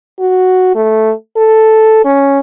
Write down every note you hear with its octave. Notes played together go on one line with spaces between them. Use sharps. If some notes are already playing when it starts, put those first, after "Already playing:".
F#4
A3
A4
C#4